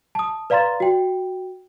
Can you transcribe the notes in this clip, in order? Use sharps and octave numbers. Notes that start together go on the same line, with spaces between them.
A5 D#6
B4 D5 F5 A#5 C6 A6
F#4 G5